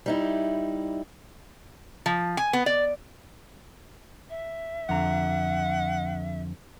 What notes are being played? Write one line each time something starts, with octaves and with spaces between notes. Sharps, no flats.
G3 D#4 E4
F3
G#5
B3
D5
E5
F2 D3 F#5 A#5